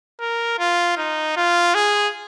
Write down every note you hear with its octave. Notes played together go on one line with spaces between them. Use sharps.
A#4
F4
D#4
F4
G#4